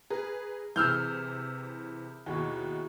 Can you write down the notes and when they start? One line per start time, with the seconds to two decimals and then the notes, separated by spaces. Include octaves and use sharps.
0.10 G#4 A#4 B4
0.76 C3 E3 E4 G#4 E6 F6 G6
2.26 D#2 B2 E4 F#4 G#4